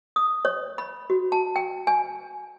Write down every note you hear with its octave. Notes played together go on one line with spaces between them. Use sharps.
D#6
C#5
B5
F#4
A5
G5
G#5